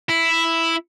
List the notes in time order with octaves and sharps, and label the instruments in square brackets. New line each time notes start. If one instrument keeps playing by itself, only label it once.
[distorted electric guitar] E4